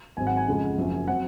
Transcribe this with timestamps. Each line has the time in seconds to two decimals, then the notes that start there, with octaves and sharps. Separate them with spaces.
0.17 G#1 G#2 F#3 C4 G#5
0.27 F#5
0.37 G#5
0.47 F2 C#3 F3 G#3
0.78 F#1 F#2 F3
1.08 F#3 C4 F#5